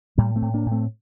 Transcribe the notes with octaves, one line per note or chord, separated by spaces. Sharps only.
A2 G3 A#3
A3 C4
A2
A#3 D4
A2
A3 C4